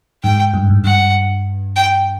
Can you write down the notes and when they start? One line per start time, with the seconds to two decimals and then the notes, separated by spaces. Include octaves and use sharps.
0.23 G#2 G5
0.54 G2
0.69 G#2
0.84 G2 F#5
1.76 G5